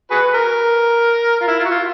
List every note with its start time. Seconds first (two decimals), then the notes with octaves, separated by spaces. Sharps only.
0.11 F#4 G#4 B4
0.34 A#4
1.41 F4
1.48 E4
1.59 F4
1.65 F#4
1.71 F4